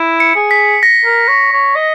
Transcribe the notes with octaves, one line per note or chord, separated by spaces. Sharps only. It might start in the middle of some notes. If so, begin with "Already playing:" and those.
Already playing: E4
C#7
G#4
B6
A#6
A#4
C#5
C#5
D#5